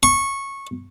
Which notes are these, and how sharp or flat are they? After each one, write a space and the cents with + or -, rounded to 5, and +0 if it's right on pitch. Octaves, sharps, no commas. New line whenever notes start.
C#6 -15